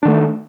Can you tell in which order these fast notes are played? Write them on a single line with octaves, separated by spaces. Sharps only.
D4 D#3 A3